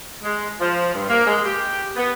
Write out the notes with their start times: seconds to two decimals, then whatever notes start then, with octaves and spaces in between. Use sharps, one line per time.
0.24 G#3
0.60 F3
0.94 G2
1.09 A#3
1.26 G#3
1.45 G4
1.96 B3